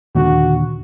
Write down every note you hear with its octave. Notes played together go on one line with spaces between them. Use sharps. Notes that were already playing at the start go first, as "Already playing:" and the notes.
D#2 A#2 D3 F#4